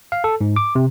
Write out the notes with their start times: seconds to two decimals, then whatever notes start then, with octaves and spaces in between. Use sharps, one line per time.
0.12 F5
0.24 A4
0.41 G#2
0.56 D6
0.75 C3